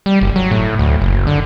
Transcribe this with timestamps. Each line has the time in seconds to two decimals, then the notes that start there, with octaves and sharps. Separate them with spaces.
0.06 G3
0.21 F#1
0.36 F#3
0.51 A2
0.79 D2
1.01 F#1
1.27 D3